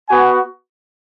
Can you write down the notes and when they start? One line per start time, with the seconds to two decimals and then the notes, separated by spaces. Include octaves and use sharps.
0.09 B3 F#4 G#5